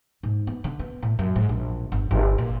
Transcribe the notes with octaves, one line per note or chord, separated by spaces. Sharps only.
G#2
B3
D3
B3
A2
F#2
G#2
A#1
G1
G1
A#2